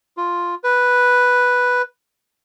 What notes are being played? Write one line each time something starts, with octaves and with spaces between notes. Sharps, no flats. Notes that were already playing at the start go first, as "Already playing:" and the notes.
F4
B4